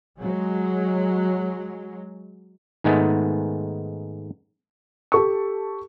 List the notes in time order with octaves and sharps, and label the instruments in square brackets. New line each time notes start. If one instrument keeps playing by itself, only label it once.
[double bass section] F#3 G#3
[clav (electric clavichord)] G#2 D#3 G#3 A3 B3
[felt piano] G4 A4 C#6